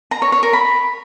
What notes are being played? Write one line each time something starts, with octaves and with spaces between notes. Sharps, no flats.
A#5
C#5
C#5
A#4
B5